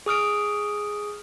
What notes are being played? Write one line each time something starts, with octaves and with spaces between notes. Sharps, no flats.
G#4 D#6 F6 D7